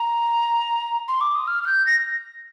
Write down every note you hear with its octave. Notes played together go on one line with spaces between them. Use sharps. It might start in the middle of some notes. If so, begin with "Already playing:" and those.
Already playing: A#5
C6
D6
D#6
F6
F6
G6
A#6